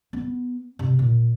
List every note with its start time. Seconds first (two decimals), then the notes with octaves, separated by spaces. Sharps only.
0.13 B3
0.79 C3
0.99 A#2